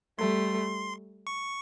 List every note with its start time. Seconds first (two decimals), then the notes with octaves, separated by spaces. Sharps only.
0.19 G3 A3 C6
1.27 C#6